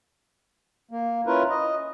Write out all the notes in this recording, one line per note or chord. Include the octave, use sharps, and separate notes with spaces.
A#3
C#4 E4 F4 A#4 B4
D#5